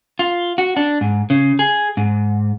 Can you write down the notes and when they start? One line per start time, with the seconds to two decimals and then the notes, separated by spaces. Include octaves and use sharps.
0.19 F4
0.58 F#4
0.77 D4
1.01 G#2
1.30 C#3
1.59 G#4
1.97 G#2